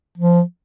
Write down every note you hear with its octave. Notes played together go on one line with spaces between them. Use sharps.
F3